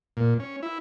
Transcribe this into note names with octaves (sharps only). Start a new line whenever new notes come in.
A#2
C#4
E4